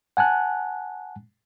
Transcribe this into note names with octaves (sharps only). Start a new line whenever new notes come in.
F#5 G#5 A5 F#6